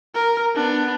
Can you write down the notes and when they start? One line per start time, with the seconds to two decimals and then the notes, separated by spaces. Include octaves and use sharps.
0.14 A#4
0.55 B3 D4